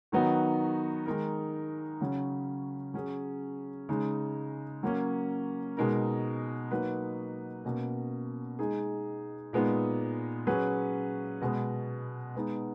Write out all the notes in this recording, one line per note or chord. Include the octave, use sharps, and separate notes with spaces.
D#3 F#3 B3 D#4 F#4
D#3 G#3 D#4 A#4
C#3 F#3 C#4
F#3 C#4 G#4
C#3 G#3 D#4
F#3 A#3 C#4
B2 G#3 D#4 A#4
F#3 A#3 D#4 F#4 B4
B2 A#3 C#4
G#3 D#4 G#4
A#2 G#3 B3 D#4
F#3 C#4 G#4 B4
B2 G#3 B3
G#3 B3 D#4